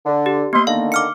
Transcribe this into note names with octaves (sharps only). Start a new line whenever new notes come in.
D3
G4
A#3 B3 D#5 C6
D3 D#3 F5
D6 F6 C#7